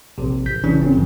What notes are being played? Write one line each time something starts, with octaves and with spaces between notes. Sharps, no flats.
A#1 C3
A1 G6 B6
C#3 E3 C#4 D4
G1 C4 C#4
G2 C#3 E3 F#3